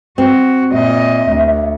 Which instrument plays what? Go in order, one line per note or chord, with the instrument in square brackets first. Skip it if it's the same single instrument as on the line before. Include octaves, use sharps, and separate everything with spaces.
[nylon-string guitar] C4 [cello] F#4
[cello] A#2 D#5 [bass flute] E5
[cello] D2